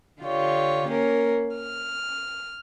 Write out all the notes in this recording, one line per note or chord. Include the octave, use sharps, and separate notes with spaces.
D3 F4 G4 C#5
A#3 C#4 A#4
F6